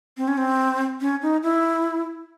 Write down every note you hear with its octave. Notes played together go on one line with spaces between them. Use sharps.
C4
C#4
C4
C#4
D#4
E4